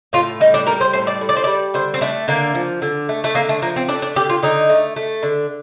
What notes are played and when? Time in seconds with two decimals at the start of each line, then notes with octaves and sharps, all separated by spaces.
0.13 A2 F4
0.40 G3 D#4
0.54 D4
0.67 G3 A#4
0.81 C5
0.93 A2 C5
1.07 D5
1.21 A2
1.29 D5
1.36 C5
1.44 G3 D5
1.74 D3 C5
1.94 C4
2.01 A3 D4
2.28 D3 A#3
2.55 F3
2.82 D3
3.09 A3
3.24 A3
3.35 D3 A#3
3.49 A3
3.62 F3 A#3
3.76 C4
3.88 A3 D4
4.02 D4
4.15 D3 G4
4.29 F4
4.42 D3 D#4
4.69 A3
4.96 A3
5.23 D3